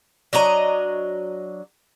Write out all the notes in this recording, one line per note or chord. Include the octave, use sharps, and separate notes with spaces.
F#3 D4 D#5 A#5